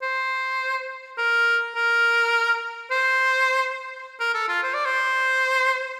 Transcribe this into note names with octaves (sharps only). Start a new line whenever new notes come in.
C5
A#4
A#4
C5
A#4
A4
F4
C5
D5
C5